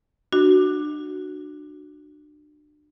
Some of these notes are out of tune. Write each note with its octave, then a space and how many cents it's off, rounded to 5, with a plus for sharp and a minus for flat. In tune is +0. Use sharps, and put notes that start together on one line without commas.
D4 +30 F#4 +0